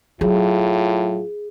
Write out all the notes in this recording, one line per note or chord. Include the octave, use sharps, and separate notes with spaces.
A2 F#3 F4 G#4